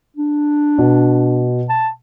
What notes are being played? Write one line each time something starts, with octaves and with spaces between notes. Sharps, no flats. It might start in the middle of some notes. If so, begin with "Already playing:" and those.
D4
B2
A5